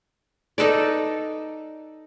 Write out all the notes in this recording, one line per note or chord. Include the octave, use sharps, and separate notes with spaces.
D#4 A4 B4 D5